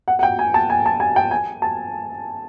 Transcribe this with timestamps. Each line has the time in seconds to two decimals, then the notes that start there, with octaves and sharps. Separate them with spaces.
0.08 F#5
0.19 F#5
0.23 G5
0.39 G#5
0.54 A5
0.70 G#5
0.86 A5
1.00 G#5
1.16 G5
1.31 G#5
1.62 A5